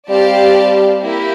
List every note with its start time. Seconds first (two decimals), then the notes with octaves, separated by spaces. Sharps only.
0.09 G3 C4 G4 D5 F5 A5
1.00 A#3 E4 G4